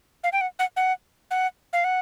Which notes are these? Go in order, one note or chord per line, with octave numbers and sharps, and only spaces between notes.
F5
G5
F#5
F#5
F#5
F#5
F5
F#5